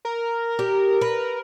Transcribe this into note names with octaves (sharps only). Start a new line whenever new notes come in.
A#4
G4
B4